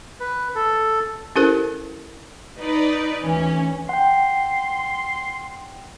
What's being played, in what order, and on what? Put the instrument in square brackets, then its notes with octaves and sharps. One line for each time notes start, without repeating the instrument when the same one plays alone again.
[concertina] B4
A4
[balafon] C#4 E4 G4 A4 A#4 C5
[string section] D#4 B4 D5
[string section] D2 C#4 [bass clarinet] E3
[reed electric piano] F#5 G5 [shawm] C6